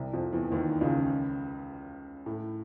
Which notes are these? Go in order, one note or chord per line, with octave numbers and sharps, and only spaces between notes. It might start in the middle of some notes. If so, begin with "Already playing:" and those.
Already playing: C2 C3
F2 F3
E2 E3
D#2 D#3
C#2 C#3
A2